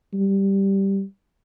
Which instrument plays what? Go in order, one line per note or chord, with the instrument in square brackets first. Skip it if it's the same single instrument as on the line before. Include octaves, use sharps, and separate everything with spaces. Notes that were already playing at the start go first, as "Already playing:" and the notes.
[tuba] G3